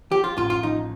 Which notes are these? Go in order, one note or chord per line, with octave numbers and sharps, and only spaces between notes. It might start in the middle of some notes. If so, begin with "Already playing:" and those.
F3 G4
F4
A1 F4
F4
F3 D#4